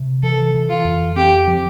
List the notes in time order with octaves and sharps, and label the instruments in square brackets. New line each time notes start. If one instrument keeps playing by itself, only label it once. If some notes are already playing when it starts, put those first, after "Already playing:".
Already playing: [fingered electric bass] C3
[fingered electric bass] E3 [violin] A4
[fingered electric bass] E3
[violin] F4
[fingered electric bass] F2
[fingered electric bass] C4 [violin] G4
[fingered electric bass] F3